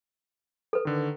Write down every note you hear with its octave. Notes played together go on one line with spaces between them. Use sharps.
A4 B4
D3 D#3